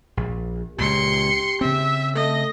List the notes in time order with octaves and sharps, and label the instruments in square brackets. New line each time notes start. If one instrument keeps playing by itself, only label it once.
[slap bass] A#1
[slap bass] C#2 A#2 [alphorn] G4 [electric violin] C6 C#7
[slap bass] C#3 C4 [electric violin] E5
[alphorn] A3 [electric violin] D#5